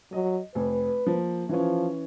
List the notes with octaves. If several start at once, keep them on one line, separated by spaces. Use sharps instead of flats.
F#3 D#5
F1 B4
F3 A#3
E3 F3 C#4